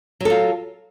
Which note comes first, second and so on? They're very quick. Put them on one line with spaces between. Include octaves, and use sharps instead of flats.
F#3 A4 F4